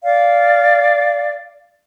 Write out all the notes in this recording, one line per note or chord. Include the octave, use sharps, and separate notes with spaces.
D5 F5